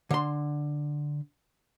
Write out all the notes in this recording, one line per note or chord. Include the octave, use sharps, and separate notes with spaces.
D3 C6